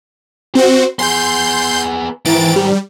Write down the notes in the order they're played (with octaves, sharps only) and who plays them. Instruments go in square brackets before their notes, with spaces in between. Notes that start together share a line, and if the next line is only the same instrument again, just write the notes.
[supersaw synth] C4 F#4 [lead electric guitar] C5
[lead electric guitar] B3 G#4 [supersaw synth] C6 G6
[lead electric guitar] G#2 D#3 [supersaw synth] E3 A6 D7
[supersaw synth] G3